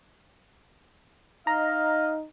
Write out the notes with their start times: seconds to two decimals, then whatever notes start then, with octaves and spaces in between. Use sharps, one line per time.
1.47 D#4 D#5 F5 A#5